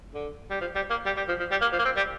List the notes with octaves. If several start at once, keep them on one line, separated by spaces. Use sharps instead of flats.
D3
G3
F3
G3
A#3
G3
G3
F3
F3
G3
A#3
F3
A#3
C4
G3